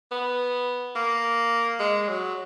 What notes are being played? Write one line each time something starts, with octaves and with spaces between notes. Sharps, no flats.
B3
A#3
G#3
F#3